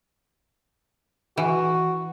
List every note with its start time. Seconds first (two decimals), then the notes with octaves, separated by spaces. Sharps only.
1.37 E3 F#4